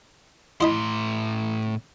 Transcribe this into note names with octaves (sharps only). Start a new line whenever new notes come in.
A2 E4 D#5 B5 C6